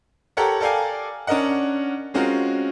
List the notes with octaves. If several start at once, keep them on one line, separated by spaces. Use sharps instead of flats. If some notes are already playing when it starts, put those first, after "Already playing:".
G4 A4 A#4 C#5 F#5 A#5
A4 A#4 D5 F5 G5 G#5
C#4 D4 A#4 D#5 F#5
G#3 C4 C#4 F4 F#4 A#4